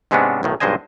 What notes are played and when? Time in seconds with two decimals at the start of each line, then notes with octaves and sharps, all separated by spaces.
0.11 G#2 C3 G#3 B3 C#4 D4
0.43 B1 A2 D#3
0.60 B1 G2 G#3 C5 D#5 G#5